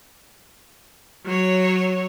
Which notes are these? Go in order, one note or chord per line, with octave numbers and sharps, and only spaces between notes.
F#3 C#5